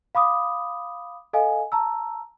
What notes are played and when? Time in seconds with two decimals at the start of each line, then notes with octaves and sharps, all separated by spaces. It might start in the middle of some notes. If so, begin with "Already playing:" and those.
0.15 F5 B5 D6 D#6
1.33 A4 D#5 F5 G#5
1.72 A5 A#5 E6